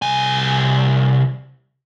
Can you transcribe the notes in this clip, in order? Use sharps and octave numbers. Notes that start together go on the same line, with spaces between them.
C2 G#5